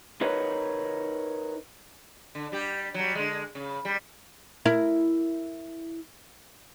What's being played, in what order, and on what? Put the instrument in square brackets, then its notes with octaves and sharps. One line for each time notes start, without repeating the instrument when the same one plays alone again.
[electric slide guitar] D#4 A#4 B4 C#5 D#5
[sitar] D3
G3 G4
F#3 G3
D3 G#3
C#3
G3
[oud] E4 A#4